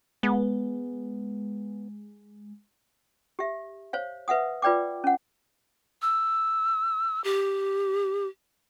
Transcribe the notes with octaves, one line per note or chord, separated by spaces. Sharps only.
G#3 B3
G4 E5
C5 C#5 F5
B4 E5 F#5 D#6
F4 B4 D5 G5 D6
C#4 F#5
E6
G4